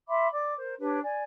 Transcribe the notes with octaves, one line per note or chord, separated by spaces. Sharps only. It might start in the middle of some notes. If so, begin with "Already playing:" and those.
E5 B5 C6 D6
D5 D6
A#4 C5
D4 G4 B4 C#5
D5 G#5